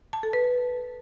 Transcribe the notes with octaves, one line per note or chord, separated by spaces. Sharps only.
A5
A4
B4